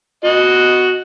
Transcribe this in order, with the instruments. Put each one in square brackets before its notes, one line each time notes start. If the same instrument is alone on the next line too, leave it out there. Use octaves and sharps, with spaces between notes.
[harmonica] F#4 D#5